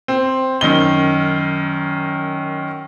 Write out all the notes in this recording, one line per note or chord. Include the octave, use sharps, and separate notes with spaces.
C4
F#2 D#3 G7